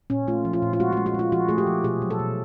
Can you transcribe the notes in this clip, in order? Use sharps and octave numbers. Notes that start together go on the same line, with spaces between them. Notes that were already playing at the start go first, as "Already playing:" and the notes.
A#2 C#4
A3 F4
F3
F4
A#2
F4
G#3 F#4
F#4
G#3
F#4
G#3 F4
F3 F#4
A3 G#4
G4
F3
B2 G#4
F#3
A4
B2